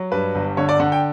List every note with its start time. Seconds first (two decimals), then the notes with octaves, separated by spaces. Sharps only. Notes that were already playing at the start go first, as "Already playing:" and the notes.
Already playing: F#3
0.12 G2 B4
0.35 G1
0.57 D3 C#5
0.69 D5
0.80 D3 F#5
0.92 G5